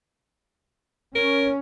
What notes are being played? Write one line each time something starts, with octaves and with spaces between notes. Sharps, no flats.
C#4 A#4